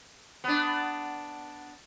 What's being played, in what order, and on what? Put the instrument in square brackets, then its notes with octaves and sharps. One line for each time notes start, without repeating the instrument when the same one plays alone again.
[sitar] B3 D4